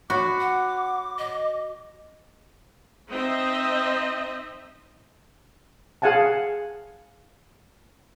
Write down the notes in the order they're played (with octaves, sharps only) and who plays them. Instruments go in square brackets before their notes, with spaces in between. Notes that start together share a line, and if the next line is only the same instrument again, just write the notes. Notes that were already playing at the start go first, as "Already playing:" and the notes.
[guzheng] F#4 [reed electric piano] C#5 B5 F#6 [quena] D6
[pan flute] F#5
D#5
[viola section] C4 D#4 D#5 E5
[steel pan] G#4 F5 F#5 G#5 A5